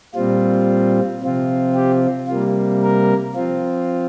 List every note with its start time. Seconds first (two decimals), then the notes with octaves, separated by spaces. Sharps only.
0.15 A#2 G3 C4 F4
1.21 C3 F3 C4 F4
1.75 G4
2.28 C3 G3 A#3 F4
2.82 A#4
3.35 F3 C4 F4